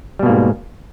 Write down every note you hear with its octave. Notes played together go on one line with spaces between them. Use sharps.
G#2 B2 G3 A#3